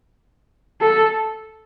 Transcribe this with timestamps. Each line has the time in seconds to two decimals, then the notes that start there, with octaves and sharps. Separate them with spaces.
0.81 A4